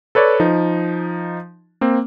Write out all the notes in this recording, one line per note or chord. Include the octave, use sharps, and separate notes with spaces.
A4 B4 C#5 D5
F3 D#4
A#3 C4